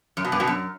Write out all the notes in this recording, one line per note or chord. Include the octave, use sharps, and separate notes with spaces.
F#2
B2
G2
B2
F#2